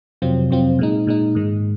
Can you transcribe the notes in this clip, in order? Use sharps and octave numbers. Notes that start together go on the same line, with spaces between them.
F2 C3 F#3 C4 F4
F2 C3 F#3 C4 F4
A#2 G#3 D#4
A#2 G#3 D#4
G#2 D#3 G#3